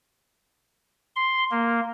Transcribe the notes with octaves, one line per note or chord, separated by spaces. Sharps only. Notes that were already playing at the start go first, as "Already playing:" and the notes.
C6
A#3